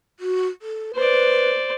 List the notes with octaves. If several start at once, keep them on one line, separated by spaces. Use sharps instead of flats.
F#4
A4
B4 C5 D5